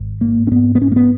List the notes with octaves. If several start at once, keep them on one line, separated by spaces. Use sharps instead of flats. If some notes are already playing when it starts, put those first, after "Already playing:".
Already playing: G#1
G#2 A#3
C#4
G#2 B3
B3
G#2 C#4
A#3
B3